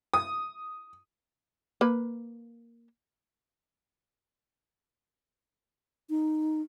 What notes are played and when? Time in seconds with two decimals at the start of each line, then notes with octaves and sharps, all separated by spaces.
0.14 D#6
1.81 A#3 B4
6.10 D#4